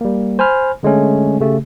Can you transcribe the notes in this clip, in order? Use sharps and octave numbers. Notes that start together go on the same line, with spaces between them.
G3 A#3
C5 G#5 B5 F6
D3 G#3 A3 C#4
C#3 A3 G4